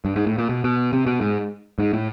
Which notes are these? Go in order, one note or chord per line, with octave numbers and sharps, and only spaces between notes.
G2
G#2
A2
A#2
B2
B2
C3
B2
G#2
G#2
A2